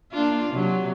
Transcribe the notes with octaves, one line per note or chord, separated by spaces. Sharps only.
A#3 D4 F4
C3 F#3